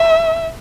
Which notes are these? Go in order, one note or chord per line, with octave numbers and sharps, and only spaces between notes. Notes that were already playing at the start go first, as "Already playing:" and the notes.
Already playing: E5